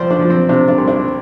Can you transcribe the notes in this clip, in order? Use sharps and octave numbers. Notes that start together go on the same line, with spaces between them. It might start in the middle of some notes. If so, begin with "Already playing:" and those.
Already playing: C2 F3 C5 D5
D4
F3
C4
C3 D4
D4
C2
D4